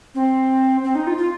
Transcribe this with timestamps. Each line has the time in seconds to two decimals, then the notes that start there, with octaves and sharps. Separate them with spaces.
0.15 C4
0.84 C4
0.95 D#4
1.07 F4
1.18 F4